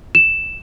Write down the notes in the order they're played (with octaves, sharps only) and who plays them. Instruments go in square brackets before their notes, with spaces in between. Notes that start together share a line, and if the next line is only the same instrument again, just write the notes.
[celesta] E7